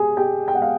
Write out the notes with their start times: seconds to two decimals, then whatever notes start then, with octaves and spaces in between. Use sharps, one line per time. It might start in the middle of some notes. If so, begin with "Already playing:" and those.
Already playing: G4 G#4 G#5
0.17 G4 G5
0.48 G5
0.55 F#5
0.62 F5